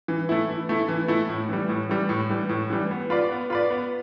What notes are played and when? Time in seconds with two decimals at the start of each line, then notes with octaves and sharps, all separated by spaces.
0.08 E3
0.29 A3 E4
0.49 E3
0.69 A3 E4
0.89 E3
1.08 A3 E4
1.29 A2
1.49 E3 G3
1.69 A2
1.89 E3 G3
2.09 A2
2.30 E3 G3
2.49 A2
2.70 E3 G3
2.91 B3
3.10 F4 B4 D5
3.31 B3
3.50 F4 B4 D5
3.70 B3